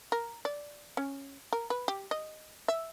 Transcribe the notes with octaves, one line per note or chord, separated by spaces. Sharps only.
A#4
D5
C#4
A#4
B4
G4
D#5
E5